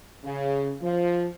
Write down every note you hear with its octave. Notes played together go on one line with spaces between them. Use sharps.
C#3
F3